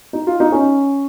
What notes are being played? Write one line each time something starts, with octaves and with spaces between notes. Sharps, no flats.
D#4
F4
D#4
C#4